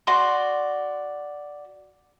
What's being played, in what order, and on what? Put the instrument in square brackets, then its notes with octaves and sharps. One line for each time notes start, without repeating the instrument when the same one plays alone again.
[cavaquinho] F#4 D5 C6